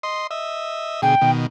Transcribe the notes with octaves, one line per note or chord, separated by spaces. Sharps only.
D#5 C6
D#5 E5
B2 D3 G#4 G5
B2 D#3